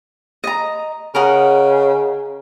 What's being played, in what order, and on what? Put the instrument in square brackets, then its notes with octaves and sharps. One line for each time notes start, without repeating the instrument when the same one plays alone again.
[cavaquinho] D#5 A#5
[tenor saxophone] C#3 [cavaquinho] A#4 D#5 F#5